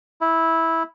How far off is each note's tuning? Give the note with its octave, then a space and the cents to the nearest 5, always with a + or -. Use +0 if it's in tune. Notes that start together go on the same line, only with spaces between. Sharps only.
E4 -10